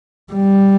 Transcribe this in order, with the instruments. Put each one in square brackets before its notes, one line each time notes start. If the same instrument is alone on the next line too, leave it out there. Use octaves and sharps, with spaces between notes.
[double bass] G3